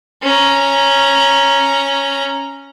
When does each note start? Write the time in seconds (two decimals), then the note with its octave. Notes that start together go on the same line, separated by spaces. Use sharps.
0.23 C#4 A#5